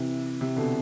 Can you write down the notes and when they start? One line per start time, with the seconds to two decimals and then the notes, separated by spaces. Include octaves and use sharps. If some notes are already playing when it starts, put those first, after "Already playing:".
Already playing: C3 E3
0.41 C3
0.56 B2 D3